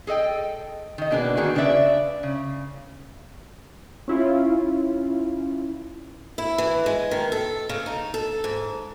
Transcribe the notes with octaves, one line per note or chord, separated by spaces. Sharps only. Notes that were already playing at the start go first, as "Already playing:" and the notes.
G#4 A4 D#5 G5
D#3 D#5
B2 A#3 D4 G#4 A#4 B4
D3 D#3 A#3 F#4 G#4
C#3 D4 B4 D5 E5
C#3
C#4 E4 F4
E4
E3
G#3
D#3
A4
C#3
D#4
A4
G#2